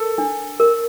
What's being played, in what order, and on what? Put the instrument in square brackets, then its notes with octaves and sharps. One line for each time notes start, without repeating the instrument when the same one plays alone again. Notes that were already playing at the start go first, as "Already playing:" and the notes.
Already playing: [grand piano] A4 [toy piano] A#4
[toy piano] D4
A#4